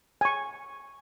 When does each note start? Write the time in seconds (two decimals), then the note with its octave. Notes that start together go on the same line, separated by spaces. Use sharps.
0.21 G#5 C#6